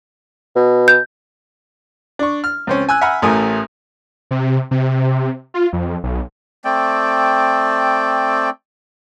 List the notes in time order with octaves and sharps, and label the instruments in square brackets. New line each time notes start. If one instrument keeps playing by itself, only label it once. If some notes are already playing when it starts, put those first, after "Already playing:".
[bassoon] B2
[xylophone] G6
[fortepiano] D4 C#6
F6
C#2 C4 C#4
G#5 E6 F#6
E5 F#5 G#5 A#5 B5 F6
A1 A2 A3 A#4 G#5 D#6
[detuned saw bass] C3
C3
F4
F2
B1
[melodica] A3 C4 D5 G5